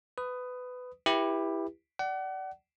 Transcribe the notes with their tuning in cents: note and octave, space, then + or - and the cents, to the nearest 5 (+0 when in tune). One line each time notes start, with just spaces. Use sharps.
B4 +20 D#6 +0
E4 +0 G4 +15 B4 -25
D5 +0 F#5 +35